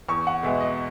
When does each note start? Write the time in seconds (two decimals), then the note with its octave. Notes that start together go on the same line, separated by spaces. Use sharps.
0.09 E2 C#6
0.27 F#5
0.43 B2 G#3 B3 E5
0.60 D#5